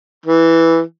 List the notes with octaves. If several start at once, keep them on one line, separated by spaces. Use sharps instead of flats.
E3